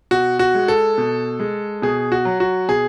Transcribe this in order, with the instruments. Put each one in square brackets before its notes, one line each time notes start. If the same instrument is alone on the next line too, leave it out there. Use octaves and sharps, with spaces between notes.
[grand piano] B2 F#4
F#4
G#3
A4
B2
G#3
B2 G#4
F#4
F#3
F#4
B2 G#4